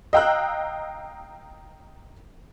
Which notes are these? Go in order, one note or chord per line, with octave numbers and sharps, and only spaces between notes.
D#5 F5 G5 A#5 E6 F#6